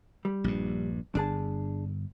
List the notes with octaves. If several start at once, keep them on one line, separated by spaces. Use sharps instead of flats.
G3
A#1 G2
G1 D4 G#4 A5